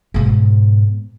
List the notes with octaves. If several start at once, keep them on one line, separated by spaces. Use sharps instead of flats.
G#2 B2